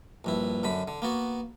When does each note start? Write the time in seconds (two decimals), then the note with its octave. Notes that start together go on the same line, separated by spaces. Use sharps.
0.24 A#1 G2 E4
0.63 F#2 D3 B5
0.88 D3
1.02 A#3 B3 F#4